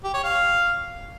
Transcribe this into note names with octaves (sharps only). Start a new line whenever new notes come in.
G4
C#5
F5